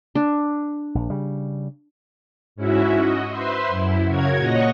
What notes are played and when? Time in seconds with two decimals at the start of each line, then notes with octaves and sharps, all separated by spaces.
0.15 D4
0.95 A#1
1.10 C#3 G3
2.56 G#2 C#4 E4 F#4 E5
3.00 F#4 D#5
3.29 B4 C5 E5 C6
3.68 F#2 E4
4.05 C#3 F#4 A#4 C#5 G#6
4.36 A#2 C#5 D#5 F#5 A#6